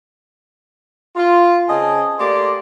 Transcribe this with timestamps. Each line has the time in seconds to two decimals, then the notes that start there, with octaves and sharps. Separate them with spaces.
1.16 F4
1.69 C#3 C4 D#5 G#5 A5
2.19 A3 A#3 G4 D5 C6